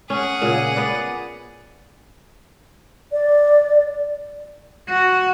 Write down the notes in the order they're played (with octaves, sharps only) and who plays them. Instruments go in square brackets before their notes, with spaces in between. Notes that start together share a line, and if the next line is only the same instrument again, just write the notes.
[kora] C#4 [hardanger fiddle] G#4 F#5
[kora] A#2 C#3
B3 B4 D5
[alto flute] D5
[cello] F#4